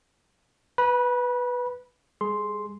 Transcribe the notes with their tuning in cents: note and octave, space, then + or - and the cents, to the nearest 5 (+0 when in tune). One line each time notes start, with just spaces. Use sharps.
B4 +0 B5 -30
G3 +40 G#4 +20 C6 +0